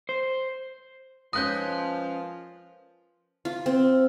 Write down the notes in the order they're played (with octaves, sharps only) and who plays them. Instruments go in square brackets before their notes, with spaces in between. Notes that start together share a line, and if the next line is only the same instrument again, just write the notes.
[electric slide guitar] C5
[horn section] F3 [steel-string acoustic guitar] G#3 C#4 [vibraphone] A#4 B4 [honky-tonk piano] D#6 F#6 G6
[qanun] F4
C4